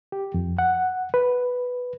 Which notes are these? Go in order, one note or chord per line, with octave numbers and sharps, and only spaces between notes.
G4
F2
F#5
B4